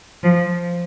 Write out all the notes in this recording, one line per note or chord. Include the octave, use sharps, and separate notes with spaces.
F3